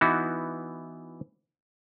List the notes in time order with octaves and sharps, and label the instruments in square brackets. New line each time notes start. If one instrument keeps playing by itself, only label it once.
[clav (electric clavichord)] E3 B3 D#4 E4 F#4